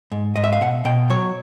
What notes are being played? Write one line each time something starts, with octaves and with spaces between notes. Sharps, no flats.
G#2
G#2 D#5
E5
F5
B2 F#5
B2 G5
F#3 C#5